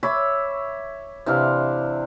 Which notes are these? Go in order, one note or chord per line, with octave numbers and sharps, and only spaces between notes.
C#5 E5 B5 D6
C3 E3 D4 F5